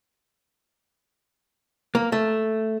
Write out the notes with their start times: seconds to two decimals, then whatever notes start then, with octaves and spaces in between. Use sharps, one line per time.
1.95 A#3
2.12 A3